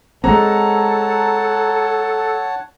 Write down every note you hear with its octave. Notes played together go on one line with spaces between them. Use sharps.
G#3 A3 C4 A4 C#5 F#5 A5 A#5